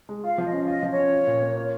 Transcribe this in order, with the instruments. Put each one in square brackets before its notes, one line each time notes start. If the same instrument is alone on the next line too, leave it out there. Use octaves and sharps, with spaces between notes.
[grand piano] G#3
[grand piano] F4 [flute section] F5
[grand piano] F3
[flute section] D#5
[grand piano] C#4
[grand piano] F4 [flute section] D#5
[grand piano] F3
[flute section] C#5
[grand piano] C#4
F4
A#2
A#3
F4